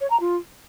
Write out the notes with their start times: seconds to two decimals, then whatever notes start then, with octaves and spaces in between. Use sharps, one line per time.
0.01 C#5
0.10 A#5
0.20 F4